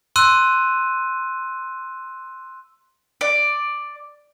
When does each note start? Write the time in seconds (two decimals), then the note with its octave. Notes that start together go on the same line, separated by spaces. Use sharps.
0.16 C6 E6 F#6 D#7
3.21 D5